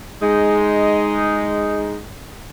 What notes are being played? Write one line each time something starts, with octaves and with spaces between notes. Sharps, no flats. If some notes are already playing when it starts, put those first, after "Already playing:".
G#3 D#4